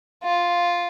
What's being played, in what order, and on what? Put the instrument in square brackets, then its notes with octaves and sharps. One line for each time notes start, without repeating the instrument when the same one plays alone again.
[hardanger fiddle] F4